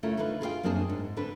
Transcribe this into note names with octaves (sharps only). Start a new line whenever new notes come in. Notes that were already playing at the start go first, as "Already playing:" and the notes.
C#3 A3 E4 F4 A#4
D3 C#4 D#4 F4 B4
F4 G#4 A#4 D#5 F5 G5
F#2 A#3 C4 D4 G#4 A5
G#2
D3 C4 D4 B4